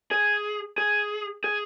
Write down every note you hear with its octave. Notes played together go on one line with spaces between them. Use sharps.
G#4
G#4
G#4